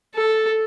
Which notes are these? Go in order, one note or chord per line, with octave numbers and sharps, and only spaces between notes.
A4